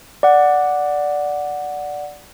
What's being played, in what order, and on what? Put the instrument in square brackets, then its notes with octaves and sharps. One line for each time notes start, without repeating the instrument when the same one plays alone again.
[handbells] D5 F#5